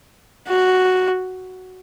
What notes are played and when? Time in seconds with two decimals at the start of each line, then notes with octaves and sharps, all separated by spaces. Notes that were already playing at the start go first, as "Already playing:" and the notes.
0.49 F#4